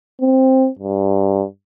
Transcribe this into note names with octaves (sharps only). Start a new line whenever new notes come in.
C4
G2